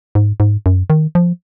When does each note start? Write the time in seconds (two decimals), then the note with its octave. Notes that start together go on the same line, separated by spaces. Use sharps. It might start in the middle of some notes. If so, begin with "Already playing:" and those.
0.15 G#2
0.40 G#2
0.66 F#2
0.90 D#3
1.15 F3